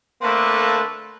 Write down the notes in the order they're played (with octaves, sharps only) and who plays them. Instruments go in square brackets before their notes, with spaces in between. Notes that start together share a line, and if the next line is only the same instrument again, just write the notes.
[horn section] D3 A3 A#3 C4 A4 B4